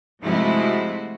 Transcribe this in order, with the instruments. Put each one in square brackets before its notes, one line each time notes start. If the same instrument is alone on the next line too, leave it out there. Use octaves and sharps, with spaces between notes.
[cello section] C3 F3 G#3 A3 E4 F#4